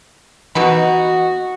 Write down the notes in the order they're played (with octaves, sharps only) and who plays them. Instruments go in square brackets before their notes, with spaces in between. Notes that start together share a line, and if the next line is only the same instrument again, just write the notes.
[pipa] B2 D#4 B5 [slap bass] E3 [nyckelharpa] F#4